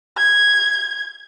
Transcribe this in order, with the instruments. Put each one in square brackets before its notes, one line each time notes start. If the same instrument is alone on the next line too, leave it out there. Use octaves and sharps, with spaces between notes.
[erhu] G#6